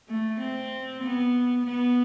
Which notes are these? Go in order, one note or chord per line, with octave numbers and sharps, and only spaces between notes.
A3
C4
B3
B3